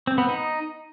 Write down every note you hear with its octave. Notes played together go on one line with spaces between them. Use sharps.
C4
B3
D#4